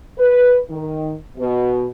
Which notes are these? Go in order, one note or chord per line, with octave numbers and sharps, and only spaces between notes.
B4
D#3
B2